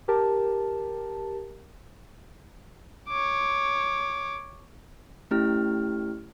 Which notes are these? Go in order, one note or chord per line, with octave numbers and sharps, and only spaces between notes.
G4 A#4 A5
C#5 D6
A3 C#4 E4 G4 F6